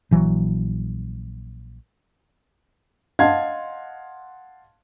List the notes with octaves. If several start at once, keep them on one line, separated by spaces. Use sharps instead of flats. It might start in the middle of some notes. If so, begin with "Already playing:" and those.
A#1 E3 F#3
D#5 F5 F#5 A5 C6 G#6